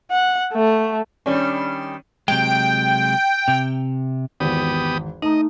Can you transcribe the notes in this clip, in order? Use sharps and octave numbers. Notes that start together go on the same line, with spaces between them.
F#5
A3
D#3 G3 C#4 D4
C3 F#3 G#3 G5
C3
G#1 E2 B3 G4 D#6
A3 D#4 D#5 A#5